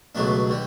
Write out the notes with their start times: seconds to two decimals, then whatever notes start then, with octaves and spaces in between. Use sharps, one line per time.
0.15 C#2 B2 F#3 A3 D4
0.49 D3 G3